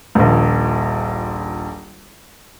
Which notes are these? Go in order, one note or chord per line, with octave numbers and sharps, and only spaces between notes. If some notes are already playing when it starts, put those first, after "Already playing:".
D#1 A#1